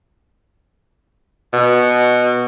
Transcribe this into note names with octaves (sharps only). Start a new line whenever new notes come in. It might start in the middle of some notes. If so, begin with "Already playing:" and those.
B2